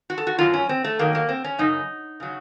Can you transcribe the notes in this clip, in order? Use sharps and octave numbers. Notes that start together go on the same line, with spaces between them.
F#4
A4
F#4
F#2 D#3 F#3 F4
C#4
C4
A3
F#2 D#3 F#3 A#3
A#3
C4
C#4
F#2 C#3 F#3 D#4
C#3 F#3